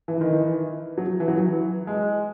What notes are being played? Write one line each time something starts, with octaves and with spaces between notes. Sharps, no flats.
E3
D#3
E3
F#3
E3
F#3
E3
G#3